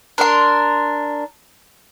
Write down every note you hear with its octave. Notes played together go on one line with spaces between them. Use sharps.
D4 A#4 C6